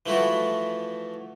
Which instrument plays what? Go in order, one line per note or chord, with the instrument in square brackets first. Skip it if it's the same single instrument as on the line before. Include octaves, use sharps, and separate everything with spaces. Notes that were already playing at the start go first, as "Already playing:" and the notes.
[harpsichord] E3 F3 A3 E4 F#4